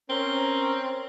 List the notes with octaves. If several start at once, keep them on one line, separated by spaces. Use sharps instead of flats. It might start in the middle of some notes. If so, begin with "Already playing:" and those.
C4 C#4 A#4 G7